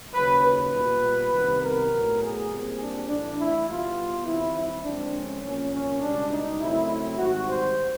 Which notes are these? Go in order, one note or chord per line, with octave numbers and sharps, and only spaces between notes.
D#2 C#3 F#3 B4
B4
A#2 G3 B3
C2 C3 D#3 G3 B3
A#4
A2 F#3 B3
G#4
A#2 G3 C4
D4
A2 E3 A3 D4
E4
B2 G3 B3 F4
G2 D#3 G3 C4 E4
E4
F#2 D3 F3 G#3 C4 D4
C#4
C2 A#2 F3 A#3 C#4
C#4
C#2 B2 G3 D4
D#4
F#2 C#3 F#3 A3 C4 E4
E4
G#2 D#3 G3 C4 F#4
C5